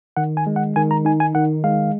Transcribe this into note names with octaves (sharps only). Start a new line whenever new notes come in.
D#3 F#5
G#5
G#3
F#5
D#3 G#5
A#5
D#4 G#5
G#5
D#3 F#5
G#3 F5